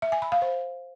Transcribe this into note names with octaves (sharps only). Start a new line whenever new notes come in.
E5
G#5
B5
F5
C5